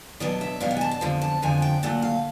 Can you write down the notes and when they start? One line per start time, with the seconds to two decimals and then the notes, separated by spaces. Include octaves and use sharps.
0.20 B2 F#3 B3 D4 D#5
0.41 E5
0.60 B2 F#3 B3 D4 F5
0.71 F#5
0.77 G#5
0.81 A5
0.91 A5
1.01 F2 D3 F3
1.21 A5
1.42 F2 D3 F3 G#5
1.62 G5
1.83 A#2 F#3 A3 F#5
2.02 F5